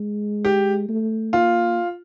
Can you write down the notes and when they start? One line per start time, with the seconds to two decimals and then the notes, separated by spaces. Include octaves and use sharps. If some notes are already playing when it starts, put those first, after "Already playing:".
Already playing: G#3
0.45 G4
0.89 A3
1.33 A#3 F4